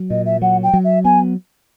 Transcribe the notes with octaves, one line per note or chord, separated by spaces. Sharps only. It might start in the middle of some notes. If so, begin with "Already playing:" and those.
Already playing: F#3
A#2 D#5
E5
F#3 F#5
G5
F#3
E5
B3 G#5